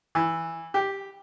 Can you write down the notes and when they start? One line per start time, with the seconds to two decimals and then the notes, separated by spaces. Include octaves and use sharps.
0.15 E3
0.74 G4